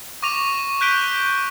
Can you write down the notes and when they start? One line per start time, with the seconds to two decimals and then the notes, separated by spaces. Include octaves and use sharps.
0.22 C#6 D6 A#6 D#7 F7
0.81 F#6 G6 B6 D7 D#7 G7